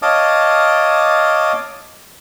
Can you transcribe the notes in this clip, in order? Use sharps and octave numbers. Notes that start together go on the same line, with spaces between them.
C#5 D#5 F5 A5 D6 D#6